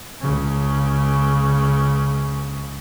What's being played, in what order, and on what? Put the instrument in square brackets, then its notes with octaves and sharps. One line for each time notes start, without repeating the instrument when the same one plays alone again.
[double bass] C#2 C#3